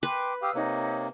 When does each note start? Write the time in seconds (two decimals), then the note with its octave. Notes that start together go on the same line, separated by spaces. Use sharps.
0.03 B4 G5 C6 D6
0.42 G4 F5 D#6 E6
0.55 C3 A#3 D#4 C#5